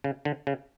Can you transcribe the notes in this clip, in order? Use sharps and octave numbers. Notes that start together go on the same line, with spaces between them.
C#3
D3
C#3